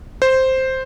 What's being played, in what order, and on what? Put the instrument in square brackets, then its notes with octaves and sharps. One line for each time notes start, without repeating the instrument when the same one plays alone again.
[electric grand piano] C5